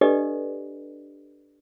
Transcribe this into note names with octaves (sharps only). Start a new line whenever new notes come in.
D4 G4 A4 B4 D5 D#5